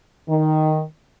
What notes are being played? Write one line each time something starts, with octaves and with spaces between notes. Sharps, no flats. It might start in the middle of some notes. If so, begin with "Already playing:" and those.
D#3